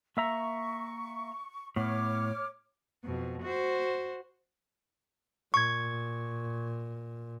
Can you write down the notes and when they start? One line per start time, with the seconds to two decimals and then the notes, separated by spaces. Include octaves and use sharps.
0.17 A#3 E5 A#5 C#6
1.76 A2 B3 C#5 D6 F6
3.04 F2 B2
3.42 F#4 C5
5.54 A#2 C#6 G#6